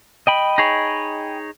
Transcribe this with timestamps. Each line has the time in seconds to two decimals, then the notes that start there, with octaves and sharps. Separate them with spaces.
0.27 D#5 G5 B5
0.58 D#4 G#4 C#5